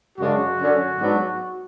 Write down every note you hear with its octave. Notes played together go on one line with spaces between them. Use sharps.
F#2 C#3 G#3 D4 F#4
F#2 D3 F#3 C#4
G#2 F#3 B3 D4